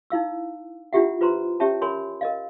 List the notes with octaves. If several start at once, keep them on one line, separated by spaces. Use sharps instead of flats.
D#4 E4 F5 E6
D4 E4 F4 G4 E5 F#5
F4 B4 C5 A#5 C6
C#4 G4 C#5 E5 A5
A#4 C#5 G#5 B5 C6
A#4 D#5 F5